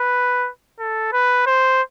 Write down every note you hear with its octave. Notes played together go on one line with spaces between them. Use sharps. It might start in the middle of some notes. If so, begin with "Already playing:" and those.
Already playing: B4
A4
B4
C5